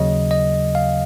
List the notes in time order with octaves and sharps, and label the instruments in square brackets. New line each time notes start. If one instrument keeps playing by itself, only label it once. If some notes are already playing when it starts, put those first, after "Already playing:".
Already playing: [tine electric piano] D#2 C#3 F#3 D#5
D#5
F5